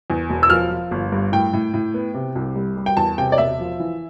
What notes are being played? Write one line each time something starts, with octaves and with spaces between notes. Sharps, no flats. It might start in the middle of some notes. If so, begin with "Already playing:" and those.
E2
E1
E6
F3 F6
F3
G1
G2
A2 G5
A2
A2
B3
C3
C2
G3
G3
G5
E2 A5
C3 G5
D5
E1 E5
F3
E3